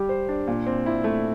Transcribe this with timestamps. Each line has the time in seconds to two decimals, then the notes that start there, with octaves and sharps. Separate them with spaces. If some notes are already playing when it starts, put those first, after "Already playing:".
Already playing: G3 G4
0.09 C5
0.29 D4
0.48 A#2
0.66 C4
0.86 E4
1.04 A3